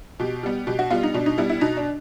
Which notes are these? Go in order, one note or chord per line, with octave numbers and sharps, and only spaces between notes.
B2 G4
G3 B3
B2 G4
F#4
G3 B3 F4
D#4
B2 D4
D#4
G3 B3 E4
E4
B2 D#4
D4